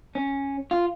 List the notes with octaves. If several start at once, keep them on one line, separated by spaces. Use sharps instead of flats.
C#4
F4